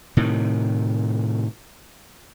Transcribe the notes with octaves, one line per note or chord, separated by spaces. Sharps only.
A2 C3 D#3